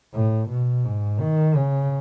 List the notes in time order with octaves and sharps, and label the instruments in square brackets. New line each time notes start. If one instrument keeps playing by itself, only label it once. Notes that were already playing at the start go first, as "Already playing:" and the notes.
[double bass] A2
B2
G#2
D#3
C#3